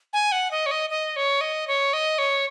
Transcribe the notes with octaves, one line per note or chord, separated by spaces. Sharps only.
G#5
F#5
D#5
C#5
D#5
D#5
C#5
D#5
C#5
D#5
C#5